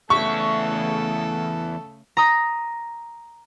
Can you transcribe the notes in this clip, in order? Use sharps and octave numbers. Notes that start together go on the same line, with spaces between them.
E2 C#3 A3 A4 E5 C#6
A#5 D#6